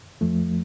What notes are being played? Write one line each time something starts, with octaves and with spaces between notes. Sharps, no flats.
F2 F3 A3